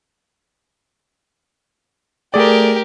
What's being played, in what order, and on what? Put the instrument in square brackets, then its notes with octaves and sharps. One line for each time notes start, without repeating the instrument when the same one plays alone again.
[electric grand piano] A3 G#4 D5 [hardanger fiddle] G4 A#4